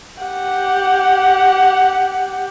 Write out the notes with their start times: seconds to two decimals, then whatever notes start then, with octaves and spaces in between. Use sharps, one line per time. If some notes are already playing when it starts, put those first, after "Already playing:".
0.23 G4 F#5